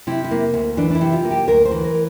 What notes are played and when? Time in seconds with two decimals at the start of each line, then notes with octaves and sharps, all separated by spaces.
0.07 C3 E4
0.24 E4
0.31 A#3
0.54 D2
0.77 E3 D4
0.90 D4
0.95 E4
1.01 C3
1.13 F4
1.24 A#3
1.31 G4
1.48 D2 A#4
1.65 C5
1.71 E3
1.84 A#4